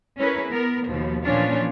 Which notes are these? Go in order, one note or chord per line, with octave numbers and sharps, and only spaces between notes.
C#4 E4 G#4 A#4 B4
B3 A#4
D#2 B2 F3
A#2 E3 F3 C#4 D4 F4